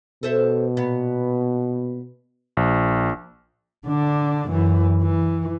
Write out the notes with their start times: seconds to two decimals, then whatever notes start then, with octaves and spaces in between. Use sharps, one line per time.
0.23 B2 A4 C5 E5
0.77 A#2 B3
2.57 A#1
3.87 D3 D4
4.49 F#2 E3
5.02 E3